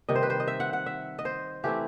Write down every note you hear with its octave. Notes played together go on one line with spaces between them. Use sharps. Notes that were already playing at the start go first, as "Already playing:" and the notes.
C3 D#3 G3 D#5
C5
B4
C5
D#5
E5
F#5
F#5
E5
D#5
C5
E3 A3 C4 E4 G4